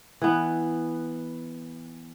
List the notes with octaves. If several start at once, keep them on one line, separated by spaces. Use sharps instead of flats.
E3 B3